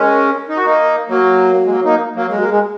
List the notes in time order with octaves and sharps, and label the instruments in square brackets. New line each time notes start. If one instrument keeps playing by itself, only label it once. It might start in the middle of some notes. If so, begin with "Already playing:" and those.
Already playing: [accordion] G#3 C#4 [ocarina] A#4
[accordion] D#4
F#4
A#3 D#4
[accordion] F#3 A#3 [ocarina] F#4
[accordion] G#3
F#3 A#3
A#3 D#4
F#3 A#3
[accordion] G#3 [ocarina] G#4
[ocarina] F#4
[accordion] A#3
[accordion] G#3 [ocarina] G#4